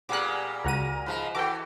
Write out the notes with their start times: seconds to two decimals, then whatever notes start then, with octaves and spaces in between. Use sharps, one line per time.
0.09 A#2 G3 B3 G#4 A#4 D6 F#6
0.65 C#2 F#4 A#4 A#5 D#7
1.06 G#2 F3 B4
1.35 E3 F#4 A4 G5 D6